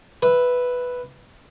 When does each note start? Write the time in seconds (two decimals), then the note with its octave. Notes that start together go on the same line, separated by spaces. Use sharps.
0.22 B4 E5